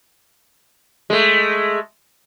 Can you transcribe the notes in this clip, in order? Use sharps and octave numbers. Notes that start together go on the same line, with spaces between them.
G#3 A3